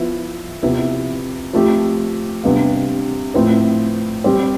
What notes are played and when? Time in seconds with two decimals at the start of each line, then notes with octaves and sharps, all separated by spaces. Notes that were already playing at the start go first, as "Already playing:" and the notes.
Already playing: F3 B3 E4
0.63 C3 F3 B3 E4 B4
1.53 F3 A3 C4 G4
2.43 C3 G3 B3 D4 F4
3.34 A2 F3 C4 E4 B4
4.24 G3 C4 G4 C5